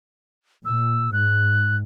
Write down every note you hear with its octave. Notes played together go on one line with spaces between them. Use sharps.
A#2 E6
G#2 F#6